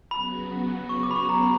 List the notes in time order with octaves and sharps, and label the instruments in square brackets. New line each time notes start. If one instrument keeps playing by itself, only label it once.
[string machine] C#3 F#3 B3 F#4 [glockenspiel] B5
[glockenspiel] C#6
D6
B5
C#6
A#5
B5